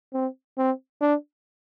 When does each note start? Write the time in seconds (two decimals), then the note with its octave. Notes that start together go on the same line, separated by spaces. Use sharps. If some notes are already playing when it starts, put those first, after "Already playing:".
0.14 C4
0.57 C4
1.01 D4